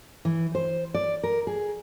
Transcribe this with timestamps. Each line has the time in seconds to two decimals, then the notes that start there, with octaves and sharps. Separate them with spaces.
0.25 E3
0.55 C5
0.94 D5
1.24 A#4
1.47 G#4